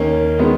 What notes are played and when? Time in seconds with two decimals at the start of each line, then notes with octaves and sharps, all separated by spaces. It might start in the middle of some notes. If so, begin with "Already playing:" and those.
Already playing: D#2 D#3 A#3 C#4
0.39 D#3 G#3 B3